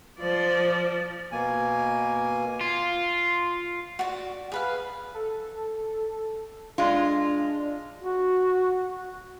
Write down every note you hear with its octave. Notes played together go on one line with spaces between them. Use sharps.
F3 D5
B2 A#3 G#5
F4
F#4 D5
G#4 B4 F5
A4
G#3 D4 F4
F#4